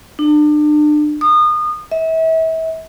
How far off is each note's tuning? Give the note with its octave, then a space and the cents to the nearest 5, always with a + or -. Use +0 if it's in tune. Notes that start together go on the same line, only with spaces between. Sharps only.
D4 +35
D#6 -30
E5 -35